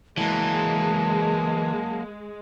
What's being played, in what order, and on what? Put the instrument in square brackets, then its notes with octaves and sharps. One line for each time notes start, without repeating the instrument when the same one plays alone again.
[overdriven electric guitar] E3 [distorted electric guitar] F#3 A#3 [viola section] G#3 [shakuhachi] A5